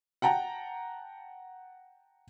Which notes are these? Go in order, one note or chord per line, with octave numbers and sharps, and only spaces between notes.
F#5 G5 A5 A#5